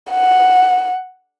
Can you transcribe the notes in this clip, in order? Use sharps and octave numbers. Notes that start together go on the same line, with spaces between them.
F#5